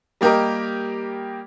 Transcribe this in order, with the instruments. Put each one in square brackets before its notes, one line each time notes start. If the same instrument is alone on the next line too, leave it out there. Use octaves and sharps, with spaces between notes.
[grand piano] G3 A#3 G4 A#4 D#5